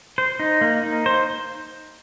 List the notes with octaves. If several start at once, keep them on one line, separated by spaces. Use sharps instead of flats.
C5
D#4
A#3
D#4
C5